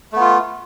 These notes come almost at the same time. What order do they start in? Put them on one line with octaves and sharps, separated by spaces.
A3 B3 F4